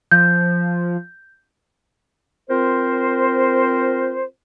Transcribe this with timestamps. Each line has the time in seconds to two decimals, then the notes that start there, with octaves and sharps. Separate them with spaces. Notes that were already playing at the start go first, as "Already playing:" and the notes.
0.11 F3 G6
2.49 C4 F4 A#4 C5